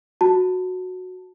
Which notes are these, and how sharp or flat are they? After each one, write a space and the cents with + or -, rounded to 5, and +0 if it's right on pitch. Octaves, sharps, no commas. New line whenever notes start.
F#4 -10 A5 +15